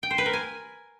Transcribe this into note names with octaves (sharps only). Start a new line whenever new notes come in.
G5
C5
B4
A#4
G#5